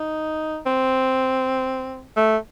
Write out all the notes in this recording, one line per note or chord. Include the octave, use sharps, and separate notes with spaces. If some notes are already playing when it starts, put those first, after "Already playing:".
Already playing: D#4
C4
A3